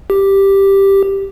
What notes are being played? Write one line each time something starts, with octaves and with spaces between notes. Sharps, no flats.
G4